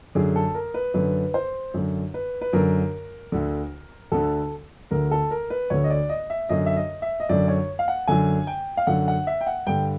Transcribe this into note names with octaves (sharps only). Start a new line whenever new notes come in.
F#2 D3 G#4
A4
A#4
B4
F#2 D3 B4
C5
F#2 D3
B4
B4
F#2 D3 A#4
D2 D3
D2 D3 A4
D2 D3 A#4
A4
A#4
B4
D2 D3 C#5
D#5
D5
D#5
E5
F#2 D3 D#5
E5
D#5
E5
D#5
F#2 D3 D5
C#5
F5
F#5
F#2 D3 G#5
G5
F5
F#2 D3 F#5
F#5
E5
G5
F#5
G2 D3 G5